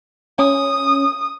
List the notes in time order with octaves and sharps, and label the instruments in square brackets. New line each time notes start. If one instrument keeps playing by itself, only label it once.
[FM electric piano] C#4 [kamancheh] D#6